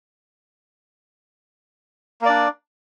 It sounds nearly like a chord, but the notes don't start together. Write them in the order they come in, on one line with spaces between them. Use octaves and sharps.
A#3 D5 D4